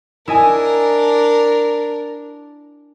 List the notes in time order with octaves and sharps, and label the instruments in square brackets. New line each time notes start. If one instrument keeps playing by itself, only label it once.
[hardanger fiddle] D4 A#4 [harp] E4 D#5 G#5